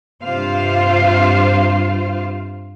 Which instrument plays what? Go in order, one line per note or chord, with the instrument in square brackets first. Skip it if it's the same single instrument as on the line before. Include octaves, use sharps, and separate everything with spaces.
[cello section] G2 C3 F4 C5 F5